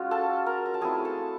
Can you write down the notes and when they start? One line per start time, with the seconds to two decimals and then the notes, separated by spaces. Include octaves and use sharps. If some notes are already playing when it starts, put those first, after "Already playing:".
Already playing: G#3 C#4 F4 F#4
0.11 A4 A5
0.46 A#4 A#5
0.66 A#5
0.74 A5
0.81 A3 C4 E4 G#4 G#5
1.05 A4 A5